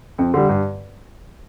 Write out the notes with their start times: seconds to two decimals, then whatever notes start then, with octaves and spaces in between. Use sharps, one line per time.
0.18 F2
0.34 D3 G3
0.49 G2